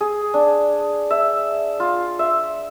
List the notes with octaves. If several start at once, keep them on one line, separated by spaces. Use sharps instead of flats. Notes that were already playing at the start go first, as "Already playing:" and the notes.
G#4
D4
E5
F4
E5